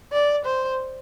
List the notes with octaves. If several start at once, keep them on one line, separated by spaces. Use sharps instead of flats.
D5
C5